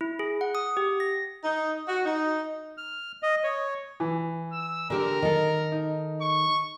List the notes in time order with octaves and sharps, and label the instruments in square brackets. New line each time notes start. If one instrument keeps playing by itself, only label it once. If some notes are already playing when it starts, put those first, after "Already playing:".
[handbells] E4
G#4
F#5
D#6
G4
A#6
[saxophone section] D#4
F#4
D#4
[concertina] F6
D#5
C#5
[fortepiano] E3
[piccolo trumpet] E6
[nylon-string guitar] D3 G4 D5 [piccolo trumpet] A#4
[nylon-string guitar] D#3 A4
[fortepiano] D#4
[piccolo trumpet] C#6